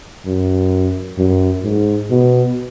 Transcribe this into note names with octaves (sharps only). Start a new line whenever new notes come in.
F#2
F#2
G#2
B2